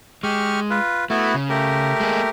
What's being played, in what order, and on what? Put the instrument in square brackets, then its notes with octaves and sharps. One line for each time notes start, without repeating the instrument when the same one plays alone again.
[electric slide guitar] G#3 [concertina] G4 C#6 F6
[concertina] F4 B4
[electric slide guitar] A3 [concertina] B3 E4 F#4
[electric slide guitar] C#3
[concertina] A3 G4 A#4
[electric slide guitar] G#3 A#3 G#4